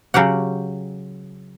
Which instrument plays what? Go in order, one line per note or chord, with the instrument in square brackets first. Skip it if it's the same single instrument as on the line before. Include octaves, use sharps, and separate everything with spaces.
[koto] C#3 F#3 C#4 G4 F#5